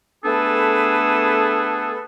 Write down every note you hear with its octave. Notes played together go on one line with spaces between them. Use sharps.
A3 B3 D4 G#4 A4 B4